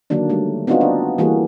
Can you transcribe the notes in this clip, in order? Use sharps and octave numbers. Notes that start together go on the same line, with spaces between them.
D3 D#3 F#3 A#3 D4
G3 A3
B3 C4 D4 D#4 F4 F#4
D4
E3 G3 A#3 F#4 G#4